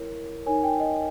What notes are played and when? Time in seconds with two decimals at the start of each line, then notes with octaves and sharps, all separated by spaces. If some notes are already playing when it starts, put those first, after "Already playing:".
Already playing: E4 A#4 C#5
0.46 D#4 A#4 C#5 G#5
0.64 G5
0.80 D#5